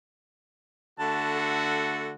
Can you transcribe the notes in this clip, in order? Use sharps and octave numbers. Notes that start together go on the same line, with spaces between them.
D3 A3 F#4 A5
A4